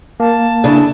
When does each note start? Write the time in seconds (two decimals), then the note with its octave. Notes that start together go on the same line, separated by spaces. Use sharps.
0.20 A#3 A5
0.64 C#3 D4 E4